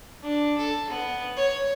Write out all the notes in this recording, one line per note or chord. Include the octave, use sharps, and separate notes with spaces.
D4
A4
B3
C#5